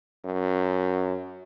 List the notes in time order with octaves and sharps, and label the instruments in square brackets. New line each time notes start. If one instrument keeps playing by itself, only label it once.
[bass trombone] F#2